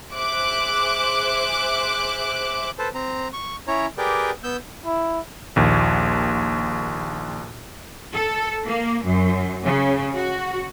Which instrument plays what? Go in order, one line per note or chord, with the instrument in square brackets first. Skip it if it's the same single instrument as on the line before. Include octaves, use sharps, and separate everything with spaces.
[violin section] G#4 C5 E5 D6 F#6
[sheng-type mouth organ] A4 B4 C5 A5
C4 A#5
C#6
C#4 E4 C#5 A#5
G4 G#4 A#4 B4 D5 G5
B3 E6 G6
[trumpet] E4
[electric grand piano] A#1 D#2
[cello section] A4
A#3
F#2
C#3
F#4